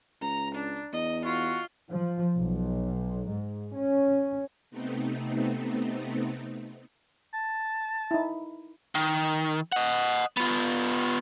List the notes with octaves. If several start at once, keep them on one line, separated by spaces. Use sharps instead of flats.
C#2 A#5
D4
E2 D#5
F4 F#4
F3
B1
G#2
C#4
C3 A3 B3 C4 D#4
A5
D#4 E4
D#3
D#5 F#5
B3 F4